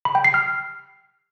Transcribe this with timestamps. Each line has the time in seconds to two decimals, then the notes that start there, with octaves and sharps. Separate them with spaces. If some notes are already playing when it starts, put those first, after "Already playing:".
0.05 B5
0.15 G5
0.24 C7
0.34 F6